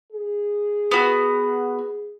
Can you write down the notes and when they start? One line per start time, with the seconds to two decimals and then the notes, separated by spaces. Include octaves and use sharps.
0.12 G#4
0.91 B3 F#4